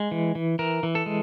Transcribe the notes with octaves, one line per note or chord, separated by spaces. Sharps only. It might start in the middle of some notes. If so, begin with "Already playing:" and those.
Already playing: G#3
E3
E3
E3 A#4
E3
A4
G#3